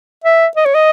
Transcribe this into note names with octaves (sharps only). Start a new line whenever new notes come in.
E5
D#5
C#5
D#5